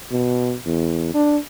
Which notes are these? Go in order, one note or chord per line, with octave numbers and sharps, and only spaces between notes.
B2
E2
D4